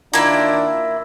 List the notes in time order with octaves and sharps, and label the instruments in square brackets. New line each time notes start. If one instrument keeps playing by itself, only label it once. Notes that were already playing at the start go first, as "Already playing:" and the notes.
[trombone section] D#3 D4 F4 [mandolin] A#3 E4